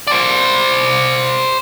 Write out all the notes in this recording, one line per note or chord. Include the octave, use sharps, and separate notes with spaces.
C5 D5